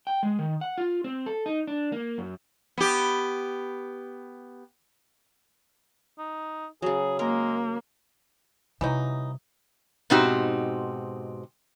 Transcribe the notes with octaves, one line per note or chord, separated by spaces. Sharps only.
G5
G#3
D#3
F#5
F4
C4
A4
D#4
D4
A#3
F#2
B3 G4
D#4
C#3 F#3 G#4
G#3 A#3 A#4
C3 E3 F#3 G3 D#4
G#2 B2 C4 D#4 F#4 G4